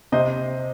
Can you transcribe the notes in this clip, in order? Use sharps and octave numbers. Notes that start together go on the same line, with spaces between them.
C3 C5 D#5